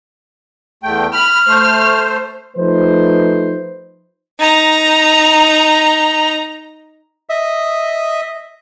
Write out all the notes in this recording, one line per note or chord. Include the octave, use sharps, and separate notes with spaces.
E2 A3 G5
B5 F6
A3 C5
F3 A3 D#4 B4 C5
D#4 A#5
D#5 E5 D#6